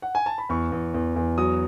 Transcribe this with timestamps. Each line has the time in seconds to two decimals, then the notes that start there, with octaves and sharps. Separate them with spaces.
0.02 F#5
0.15 G#5
0.26 A5
0.38 B5
0.49 E2 C#6
0.72 E2
0.94 E2
1.16 E2
1.38 F#3 D#6